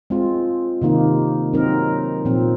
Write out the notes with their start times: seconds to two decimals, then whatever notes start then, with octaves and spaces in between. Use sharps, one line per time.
0.10 G#3 C4 F4
0.81 C3 D#3 A#3 D#4
1.53 F#3 C4 D#4 A#4
2.25 A#2 F3 C4